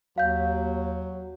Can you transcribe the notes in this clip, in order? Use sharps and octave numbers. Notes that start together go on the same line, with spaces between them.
D#2 F#3 F5 G6